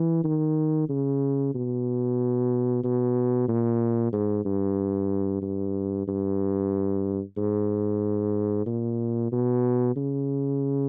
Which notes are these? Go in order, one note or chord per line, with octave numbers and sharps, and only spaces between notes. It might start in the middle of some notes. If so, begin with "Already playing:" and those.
Already playing: E3
D#3
C#3
B2
B2
A#2
G#2
G2
G2
G2
G#2
A#2
B2
C#3